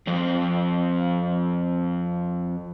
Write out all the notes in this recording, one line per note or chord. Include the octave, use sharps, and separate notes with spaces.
F2 C4